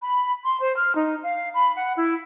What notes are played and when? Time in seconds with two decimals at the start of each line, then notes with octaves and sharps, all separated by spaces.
0.01 B5
0.45 C6
0.60 C5
0.76 F6
0.94 D#4
1.23 F5
1.54 B5
1.76 F#5
1.96 E4